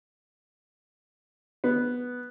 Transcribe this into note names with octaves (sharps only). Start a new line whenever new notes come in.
B3